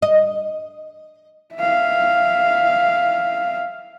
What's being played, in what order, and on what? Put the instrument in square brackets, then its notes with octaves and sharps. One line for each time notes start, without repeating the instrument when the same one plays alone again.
[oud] D#5
[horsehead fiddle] E5 F5